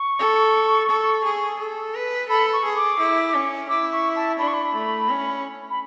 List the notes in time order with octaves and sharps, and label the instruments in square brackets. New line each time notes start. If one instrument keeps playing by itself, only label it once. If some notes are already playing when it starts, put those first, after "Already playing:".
Already playing: [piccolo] C#6
[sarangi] A4
A4
G#4
A4
B4
[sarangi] A4 [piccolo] B5
[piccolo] C#6
[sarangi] G#4
[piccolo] D6
[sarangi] E4
C#4
[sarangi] E4 [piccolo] D6
[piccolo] C#6
A5
[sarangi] D4 [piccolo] B5
[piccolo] C#6
B5
[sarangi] A3
C#4
[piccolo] B5